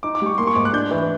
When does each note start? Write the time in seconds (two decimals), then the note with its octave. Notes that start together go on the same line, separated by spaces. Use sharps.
0.03 D#4 D6
0.15 D6
0.21 G3 C#6
0.38 A#3 C6
0.47 C#6
0.55 G#2 D6
0.65 F#6
0.73 D4 G6
0.91 E3